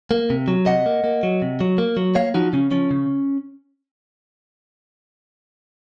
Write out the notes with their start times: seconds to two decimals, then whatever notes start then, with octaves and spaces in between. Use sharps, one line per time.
0.11 A#3
0.30 C3
0.48 F#3
0.66 C3 D#5 F#5
0.86 A#3
1.04 A#3
1.23 F#3
1.42 C3
1.61 F#3
1.78 A#3
1.97 F#3
2.15 A#3 C#5 F5
2.34 F3 D#4 F#4
2.53 C#3 C#4
2.71 F3 C#4
2.91 C#3